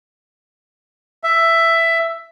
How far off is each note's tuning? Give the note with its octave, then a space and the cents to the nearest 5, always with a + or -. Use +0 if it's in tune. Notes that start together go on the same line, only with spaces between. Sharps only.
E5 +10